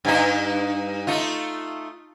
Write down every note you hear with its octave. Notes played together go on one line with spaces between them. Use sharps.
G2 D#4
A3 D#4 F4